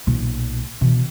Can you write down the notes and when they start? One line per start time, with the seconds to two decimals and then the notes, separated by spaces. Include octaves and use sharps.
0.07 B1 A#2
0.81 B2 E3